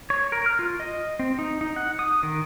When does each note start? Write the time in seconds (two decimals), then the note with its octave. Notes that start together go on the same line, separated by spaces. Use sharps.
0.10 C#5
0.32 A#4
0.46 F6
0.59 F4
0.80 D#5
1.19 C4
1.39 D#4
1.61 D#4
1.76 F#5
1.99 D#6
2.23 D#3